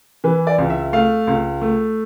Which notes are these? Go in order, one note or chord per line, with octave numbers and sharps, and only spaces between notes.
E3 B4
D5
C#2
E5
A3 F5
C#2
A3